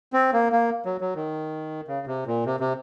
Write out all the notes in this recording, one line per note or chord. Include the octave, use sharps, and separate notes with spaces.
C4
A#3
A#3
F#3
F#3
D#3
C#3
C3
A#2
C3
C3